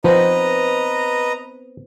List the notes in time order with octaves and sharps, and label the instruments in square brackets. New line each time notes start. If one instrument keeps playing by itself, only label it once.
[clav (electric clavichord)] F3 [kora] B3 C4 D#4 [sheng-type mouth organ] B4 D#5 A#5